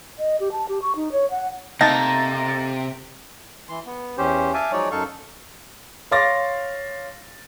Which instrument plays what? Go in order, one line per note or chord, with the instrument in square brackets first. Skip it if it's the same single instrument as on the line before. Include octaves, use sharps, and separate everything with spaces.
[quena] D#5
G4
A5
G4
C#6
D#4
C#5
F#5
[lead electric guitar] C3 [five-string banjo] A3 A#3 D#4 [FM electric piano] A6 A#6
[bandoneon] E3 C6
B3
E2 C#4 G4 C5
E5 F5 G#5 A5 D6
F3 F#3 G#3 D#4 C#5 D5
F#2 D#4 A4 F5 C#6
[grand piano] C#5 F5 C6 D6 A6 A#6